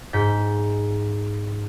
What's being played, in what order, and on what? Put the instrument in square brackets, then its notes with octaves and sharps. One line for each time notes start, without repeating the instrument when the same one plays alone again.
[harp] G#2 G6 B6